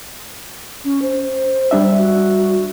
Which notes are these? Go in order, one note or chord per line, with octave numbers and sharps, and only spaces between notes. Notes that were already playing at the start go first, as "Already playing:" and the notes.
C#4
C5
G3 D4 E5
F#4